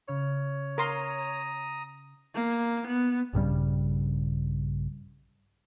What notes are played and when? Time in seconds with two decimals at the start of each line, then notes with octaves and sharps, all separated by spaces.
0.08 C#3 C#5 F6
0.78 A#4 A#5 C6 D#6
2.34 A#3
2.87 B3
3.33 A#1 G2 C#3 G3